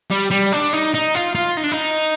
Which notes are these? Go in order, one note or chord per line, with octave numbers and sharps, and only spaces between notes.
G3
G3
D4
D#4
D#4
F4
F4
D#4
D4
D#4